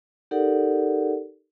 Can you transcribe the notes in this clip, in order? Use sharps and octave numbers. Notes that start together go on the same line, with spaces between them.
D#4 G4 A4 A#4 D5 F#5